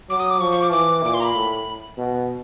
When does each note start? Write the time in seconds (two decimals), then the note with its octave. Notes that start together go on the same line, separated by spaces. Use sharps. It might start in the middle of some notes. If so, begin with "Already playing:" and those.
0.10 F#3 D6
0.20 D#6
0.30 D6
0.40 F3 C#6
0.52 C#6
0.62 D6
0.72 E3 D6
1.03 A#2 D6
1.14 C6
1.20 A#5
1.24 B5
1.35 A2
1.98 B2